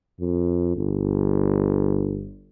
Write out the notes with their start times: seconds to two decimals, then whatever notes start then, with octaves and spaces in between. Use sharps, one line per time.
0.20 F2
0.77 G1